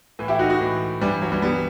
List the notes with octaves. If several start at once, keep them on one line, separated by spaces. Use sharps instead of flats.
A2 E3
E4 G4
D#4 F#4
D#4 F#4
A2 E3
G2 E3 G3
F#3
E3 G3
E3 G3 B3